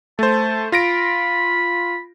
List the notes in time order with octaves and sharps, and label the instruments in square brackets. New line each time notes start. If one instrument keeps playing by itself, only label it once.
[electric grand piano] A3 C5 [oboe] A5
[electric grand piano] F4 A#6 D7 [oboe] B5